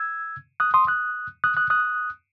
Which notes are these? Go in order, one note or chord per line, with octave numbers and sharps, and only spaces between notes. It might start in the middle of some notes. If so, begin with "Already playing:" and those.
Already playing: E6 G#6
D#6 F#6
C6 D#6
D#6 F#6
D#6 F#6
D#6 F#6
D#6 F#6